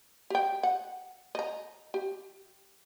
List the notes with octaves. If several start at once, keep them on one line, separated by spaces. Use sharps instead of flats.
G4 G5
F#5
D#5 A#5
G4